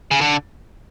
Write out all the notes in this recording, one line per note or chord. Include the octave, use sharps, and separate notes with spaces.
C#3
D3